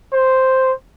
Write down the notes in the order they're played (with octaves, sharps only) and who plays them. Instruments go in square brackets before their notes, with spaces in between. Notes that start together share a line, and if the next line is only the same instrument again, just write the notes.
[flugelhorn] C5